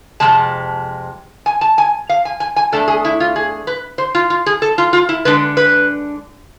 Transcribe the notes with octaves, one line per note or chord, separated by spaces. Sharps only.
F2 C3 G#3 A5
G#5
A5
G#5
F5
G#5
G#5
G#5
E2 B2 A3 D4 A4
G#4
E4
F4
G#4
B4
C5
F4
F4
G#4
A4
F4
F4
E4
D3 G#3 D4 B4
B4